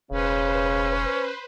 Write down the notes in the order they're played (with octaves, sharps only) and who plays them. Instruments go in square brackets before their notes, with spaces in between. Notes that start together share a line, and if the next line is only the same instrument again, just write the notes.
[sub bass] E1 [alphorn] C#3 [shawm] C#4 [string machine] B4 C5